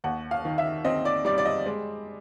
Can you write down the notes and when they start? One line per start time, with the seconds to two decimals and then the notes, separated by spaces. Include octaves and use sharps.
0.04 D#2 F#5
0.31 F5
0.45 D#3
0.58 E5
0.85 C4 D#5
1.05 D5
1.25 G3 D5
1.38 D5
1.45 D#5
1.66 G#3